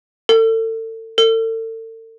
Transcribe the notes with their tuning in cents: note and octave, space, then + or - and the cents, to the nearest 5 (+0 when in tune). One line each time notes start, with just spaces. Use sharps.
A4 +35
A4 +40